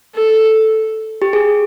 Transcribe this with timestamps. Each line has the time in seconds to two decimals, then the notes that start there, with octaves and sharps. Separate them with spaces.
0.15 A4
1.22 G4
1.33 G#4